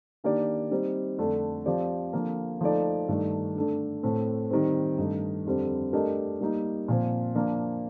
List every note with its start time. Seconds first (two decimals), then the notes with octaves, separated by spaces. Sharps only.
0.24 D#3 A#3 D4 G4 D5
0.71 G3 C4 D#4
1.18 F2 D3 A3 D4 A4
1.66 F3 C4 G4 D5
2.13 D3 F3 A#3
2.61 F3 A3 D#4 A4 D5
3.09 G2 D#3 A3 D4
3.56 D3 A3 D4
4.03 A2 A3 C4
4.51 D#3 G3 C4
4.98 G2 D#3 A3 D#4
5.46 F2 D3 G3 C4
5.93 A3 D4 G4 A#4 D#5
6.41 G3 A#3 D#4
6.88 A#2 F3 C4
7.35 F3 A#3 D4